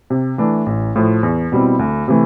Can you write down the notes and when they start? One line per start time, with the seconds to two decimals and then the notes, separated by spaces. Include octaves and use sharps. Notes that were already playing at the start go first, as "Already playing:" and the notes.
0.10 C3
0.38 E3 A3 D4
0.66 A1
0.96 A2 F3
1.23 E2
1.52 B2 G3 C4 E4
1.79 D2
2.08 C3 E3 A3